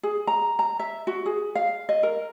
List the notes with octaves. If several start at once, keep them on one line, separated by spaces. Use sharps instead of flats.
G#4
A#5
A#5
E5
F#4
G#4
F5
D#5
A#4